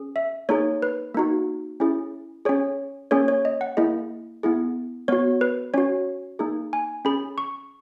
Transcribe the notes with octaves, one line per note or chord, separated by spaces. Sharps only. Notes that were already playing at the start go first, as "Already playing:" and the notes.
Already playing: C#4 G#4
E5
A#3 D#4 G#4 C#5
B4
A#3 D#4 F#4
C#4 E4 G#4
C#4 G#4 C#5
A#3 C#4 G#4 C#5
C#5
D#5
F#5
A#3 E4 G#4 D#5
B3 E4 G#4
B3 F#4 C#5
B4
C#4 F#4 C#5
A#3 D#4 G#4
G#5
C#4 G#4 B5
C#6